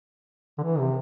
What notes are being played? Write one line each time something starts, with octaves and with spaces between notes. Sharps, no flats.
D3
E3
C3